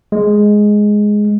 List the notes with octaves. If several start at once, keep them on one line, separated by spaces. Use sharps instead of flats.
G#3